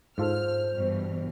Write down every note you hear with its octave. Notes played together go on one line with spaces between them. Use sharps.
G#2 F4 A4 C5 F6
G2 B2 E3